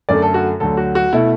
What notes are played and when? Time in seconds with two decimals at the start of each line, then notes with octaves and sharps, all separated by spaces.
0.09 F#2 D3 A3 D5
0.22 A4
0.34 F#4
0.60 D2 D3 F#3 A4
0.77 F#4
0.95 F#4
1.13 B2 A3 E4